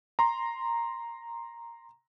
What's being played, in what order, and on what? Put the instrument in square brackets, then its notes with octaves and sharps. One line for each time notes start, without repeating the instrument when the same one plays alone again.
[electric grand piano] A#5 C6